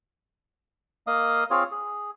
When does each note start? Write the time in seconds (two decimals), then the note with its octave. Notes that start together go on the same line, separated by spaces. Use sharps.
1.07 A#3 D#5 F5 D#6
1.51 C4 F4 G#4 C#5 F5
1.72 G#4